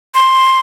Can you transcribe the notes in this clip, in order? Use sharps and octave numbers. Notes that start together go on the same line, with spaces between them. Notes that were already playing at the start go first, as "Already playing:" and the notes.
C6